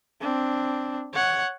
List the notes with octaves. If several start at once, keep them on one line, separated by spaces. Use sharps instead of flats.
C4 D4
C#5 F#5